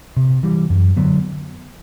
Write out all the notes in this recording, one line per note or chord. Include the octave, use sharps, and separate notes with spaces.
C3
E3 G3
F#2
D3 F#3 B3